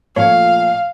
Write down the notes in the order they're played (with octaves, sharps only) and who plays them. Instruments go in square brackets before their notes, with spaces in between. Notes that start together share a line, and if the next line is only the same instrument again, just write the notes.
[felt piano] A#2 F3 A3 [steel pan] C#5 [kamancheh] F5